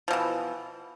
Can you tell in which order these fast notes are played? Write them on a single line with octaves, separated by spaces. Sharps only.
F3 B2 E3